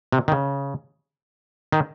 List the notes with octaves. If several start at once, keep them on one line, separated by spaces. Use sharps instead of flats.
C3
D#3
C#3
D#3